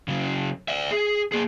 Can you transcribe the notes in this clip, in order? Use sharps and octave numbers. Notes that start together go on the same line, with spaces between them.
C#3 F#3
D5 E5
G#4
A#3 G#4